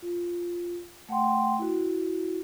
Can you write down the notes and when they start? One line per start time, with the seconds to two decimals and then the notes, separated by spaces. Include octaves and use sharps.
0.02 F4
1.09 A3 F#5 G5 C6
1.59 E4 F#4